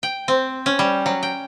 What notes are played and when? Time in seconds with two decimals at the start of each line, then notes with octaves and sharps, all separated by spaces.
0.03 G5
0.28 C4
0.66 C#4
0.79 G3
1.06 F#3
1.23 G5